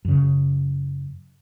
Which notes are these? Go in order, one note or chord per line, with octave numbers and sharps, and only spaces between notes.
F#2 C#3